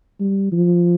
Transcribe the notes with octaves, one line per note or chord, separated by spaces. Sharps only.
G3
F3